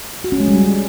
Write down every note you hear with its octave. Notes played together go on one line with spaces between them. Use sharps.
F#4
C#4
G#3
G3